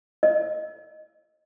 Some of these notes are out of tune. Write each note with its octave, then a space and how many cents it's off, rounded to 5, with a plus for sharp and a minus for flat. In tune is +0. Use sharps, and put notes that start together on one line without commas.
D#5 -15